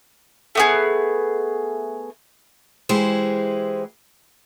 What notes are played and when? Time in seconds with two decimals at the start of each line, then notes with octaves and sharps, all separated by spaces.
0.55 A3 B3 G#4
2.89 E3 G#3 E4 G4 G#4 C5